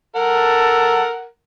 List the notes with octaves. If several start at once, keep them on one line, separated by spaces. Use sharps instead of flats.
A4 A#4 F#5